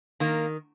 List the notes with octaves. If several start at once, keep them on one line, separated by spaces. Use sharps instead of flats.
D#3 A#3